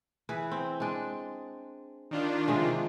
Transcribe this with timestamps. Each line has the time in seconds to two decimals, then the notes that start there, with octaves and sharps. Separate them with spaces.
0.29 E3 G#4 B4
0.52 C4
0.80 G#3 D4
2.11 D#3 D4 F4
2.48 C3 F3 G#3